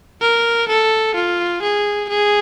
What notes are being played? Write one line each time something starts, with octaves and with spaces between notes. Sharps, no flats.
A#4
A4
F4
G#4
G#4